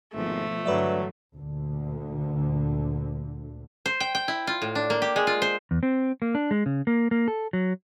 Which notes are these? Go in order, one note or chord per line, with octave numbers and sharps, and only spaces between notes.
G#1 B2 F3 A3 B3
G2 D3 E3 F#3 B4 D5 E5
D2 A#2 D3
C5
G5
G5
E4
F4
A2
D4
A#3
G4
G#3
F4
C5
E2
C4
A#3
D4
G#3
C#3
A#3
A#3
A4
F#3